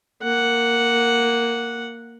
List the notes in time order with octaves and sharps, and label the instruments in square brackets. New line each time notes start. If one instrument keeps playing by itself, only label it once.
[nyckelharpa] A#3 F#5